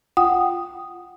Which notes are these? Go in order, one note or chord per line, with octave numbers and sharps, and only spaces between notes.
F4 F#5 G5 D#6